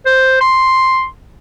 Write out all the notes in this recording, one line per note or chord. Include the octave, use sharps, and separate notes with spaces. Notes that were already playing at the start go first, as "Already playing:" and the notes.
C5
C6